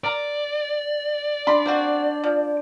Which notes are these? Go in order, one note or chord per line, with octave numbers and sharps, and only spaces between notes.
A#4 D5 A#5
D4 B5 C6 D6
A#3 C4 F#4 C5
F3